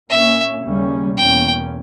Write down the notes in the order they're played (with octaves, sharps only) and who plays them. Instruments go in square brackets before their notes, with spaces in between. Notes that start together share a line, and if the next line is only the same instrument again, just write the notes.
[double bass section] A#2 A#3 C#4 [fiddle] E5
[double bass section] D#2 C#3 G3 A#3 C#4
[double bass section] E2 B2 A#3 C#4 [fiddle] G5